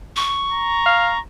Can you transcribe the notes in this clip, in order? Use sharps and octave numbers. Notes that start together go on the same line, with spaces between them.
C#6
A#5
F5